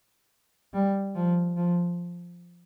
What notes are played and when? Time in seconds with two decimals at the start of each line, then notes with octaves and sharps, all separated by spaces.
0.73 G3
1.15 F3
1.56 F3